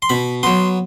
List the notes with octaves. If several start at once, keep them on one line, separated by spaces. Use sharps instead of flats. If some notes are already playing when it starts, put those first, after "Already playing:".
C6
B2 B5
F#3 B3 C6